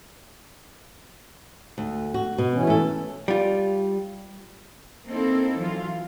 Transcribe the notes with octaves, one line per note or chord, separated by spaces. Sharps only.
D2
F#4
B2
E3 C#4
A3 A4
G3 F4
A#3 C4 D#4 E4 A4
E3 F#3 F4